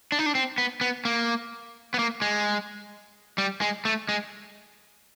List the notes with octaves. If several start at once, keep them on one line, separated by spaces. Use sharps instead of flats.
D4
D#4
D4
C4
B3
B3
A#3
B3
A#3
G#3
G3
G#3
A3
G#3